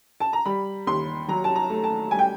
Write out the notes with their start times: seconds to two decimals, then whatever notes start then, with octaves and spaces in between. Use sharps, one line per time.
0.20 A5
0.33 A#5
0.45 G3 B5
0.87 D#2 C6
1.28 F#3 A#5
1.44 A5
1.55 A#5
1.70 A3
1.84 A5
2.11 G3 G#5
2.19 G5